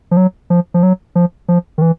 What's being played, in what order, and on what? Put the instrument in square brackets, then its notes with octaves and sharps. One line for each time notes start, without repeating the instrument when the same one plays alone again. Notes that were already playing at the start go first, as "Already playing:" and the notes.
[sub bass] F3
F#3
F3
F3
F#3
F3
F3
D#3
E3